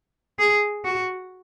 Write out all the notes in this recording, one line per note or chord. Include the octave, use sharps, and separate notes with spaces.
G#4
F#4